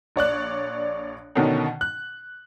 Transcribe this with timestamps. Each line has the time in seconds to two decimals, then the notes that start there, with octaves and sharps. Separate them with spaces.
0.16 A#1 C#5 D5 F#6
1.35 B2 D3 D#3 C#4 D#4
1.81 F#6